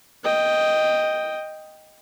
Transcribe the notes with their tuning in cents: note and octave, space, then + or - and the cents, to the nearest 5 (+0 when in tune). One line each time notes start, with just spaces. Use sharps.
D#5 +0 G5 +5